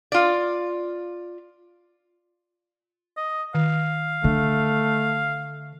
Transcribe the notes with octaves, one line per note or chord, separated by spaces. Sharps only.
F4 D5
D#5
D#3 F5
D3 A3